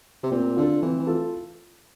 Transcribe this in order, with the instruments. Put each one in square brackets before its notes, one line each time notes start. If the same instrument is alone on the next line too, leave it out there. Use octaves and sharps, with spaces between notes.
[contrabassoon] C3
[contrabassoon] A#2 [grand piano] C4
[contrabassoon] D3 [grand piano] F4 A4
[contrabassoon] E3 [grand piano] C4
[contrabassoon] E3
[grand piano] F4 A4